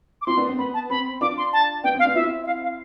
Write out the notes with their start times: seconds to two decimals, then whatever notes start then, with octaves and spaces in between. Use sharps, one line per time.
0.22 D6
0.26 C4 E4 C6
0.37 B3 D4
0.48 C4
0.59 B3 B5
0.74 A5
0.90 C4 B5
1.21 D4 F4 D6
1.37 C6
1.53 A5
1.84 B3 D4 G5
1.94 C4 F5
2.05 B3 D4
2.15 C4 E4 E5
2.43 E5
2.47 F5
2.63 F5